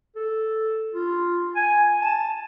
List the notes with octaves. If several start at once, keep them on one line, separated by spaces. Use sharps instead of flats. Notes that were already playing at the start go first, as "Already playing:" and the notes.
A4
F4
G#5
A5